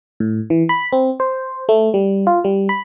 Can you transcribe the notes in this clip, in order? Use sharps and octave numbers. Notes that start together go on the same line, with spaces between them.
A2
E3
B5
C4
C5
A3
G3
F4
G3
B5